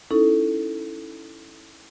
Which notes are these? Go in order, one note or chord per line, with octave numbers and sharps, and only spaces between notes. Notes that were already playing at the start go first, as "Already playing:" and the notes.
C#4 D#4 E4 A4